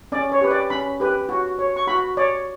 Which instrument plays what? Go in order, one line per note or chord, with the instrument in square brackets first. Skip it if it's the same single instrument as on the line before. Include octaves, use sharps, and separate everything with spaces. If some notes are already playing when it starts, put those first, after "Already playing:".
[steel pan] C#4 D5
C#5
G4 B4
D5
C#4 B5
G4 B4
F#4
C#5
C#6
F#4 B5
C#5 D5